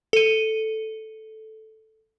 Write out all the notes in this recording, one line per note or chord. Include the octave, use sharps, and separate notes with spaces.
A4 D#7